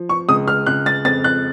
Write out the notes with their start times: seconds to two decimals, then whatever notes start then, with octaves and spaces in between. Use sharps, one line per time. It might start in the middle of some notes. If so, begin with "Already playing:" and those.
Already playing: F3
0.09 C#6
0.28 C#2 D#6
0.48 F6
0.66 C#2 F#6
0.86 A6
1.05 F2 A6
1.24 F#6